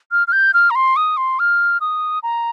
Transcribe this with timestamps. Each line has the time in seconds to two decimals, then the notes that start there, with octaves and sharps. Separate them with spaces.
0.12 F6
0.27 F6
0.32 G6
0.54 F6
0.70 A#5
0.75 C6
0.96 D#6
1.17 C6
1.39 F6
1.81 D#6
2.23 A#5